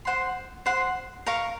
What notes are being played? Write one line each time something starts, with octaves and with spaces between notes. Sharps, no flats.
C5 F#5 C6
C5 F#5 C6
A#4 F5 A#5 C#6